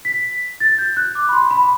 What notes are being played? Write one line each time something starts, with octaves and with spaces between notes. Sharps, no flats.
B6
A6
G6
F#6
D6
B5
C6
B5